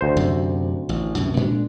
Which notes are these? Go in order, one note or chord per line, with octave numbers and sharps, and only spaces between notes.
D2 C5
F#2 C3
A1
C2 F#2 B2
A#2 G#3 D4